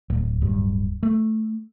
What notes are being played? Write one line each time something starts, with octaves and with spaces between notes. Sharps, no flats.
D1
D1 G2
A3